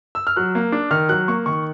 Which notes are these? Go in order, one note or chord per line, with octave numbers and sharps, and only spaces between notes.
E6
F6
F#3 F#6
A#3
D4
D#3 F6
F#3 F#6
A#3 C#6
D#3 C#6